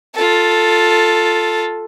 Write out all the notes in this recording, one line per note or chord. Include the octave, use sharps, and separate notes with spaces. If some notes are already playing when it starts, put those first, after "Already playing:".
F4 A4